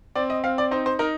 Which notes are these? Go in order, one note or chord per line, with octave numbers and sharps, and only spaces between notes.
C4 D5
D#5
C4 F5
D5
D#4 C5
C5
D#4 A#4